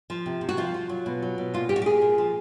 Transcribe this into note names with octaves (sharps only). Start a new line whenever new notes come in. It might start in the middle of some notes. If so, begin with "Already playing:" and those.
F3
C3
C3
F#4
F3 F4
F3
F#3
B2
F#3
B2
A#2 F4
A#2 G4
F#4
G4
A#2 G#4
A#2
F3